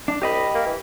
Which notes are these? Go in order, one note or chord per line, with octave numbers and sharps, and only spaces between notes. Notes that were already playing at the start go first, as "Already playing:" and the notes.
D4
C2 G4 D#5 B5
A#3
E3